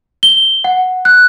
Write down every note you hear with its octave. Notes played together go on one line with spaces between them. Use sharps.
G7
F#5
F#6